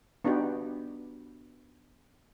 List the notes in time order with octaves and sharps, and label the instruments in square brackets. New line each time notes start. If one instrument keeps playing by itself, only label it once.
[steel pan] B3 D4 D#4 F#4 G4